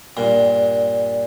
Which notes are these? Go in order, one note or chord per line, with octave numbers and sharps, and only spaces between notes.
G2 A#2